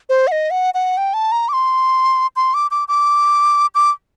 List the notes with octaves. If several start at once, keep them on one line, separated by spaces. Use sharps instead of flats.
C5
F#5
D#5
F#5
F#5
G5
A5
A#5
D6
C6
C6
D6
D6
D6
D6